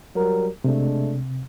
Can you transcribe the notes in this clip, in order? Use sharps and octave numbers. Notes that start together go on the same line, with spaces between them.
F#3 G3 A#4
C3 G#3 A3 D4